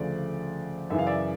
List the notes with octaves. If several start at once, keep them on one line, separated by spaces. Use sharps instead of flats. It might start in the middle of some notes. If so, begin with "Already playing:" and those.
Already playing: D2 C#3 F3 C5 D5
F#2 C#3 E3 E5
F5
D5 E5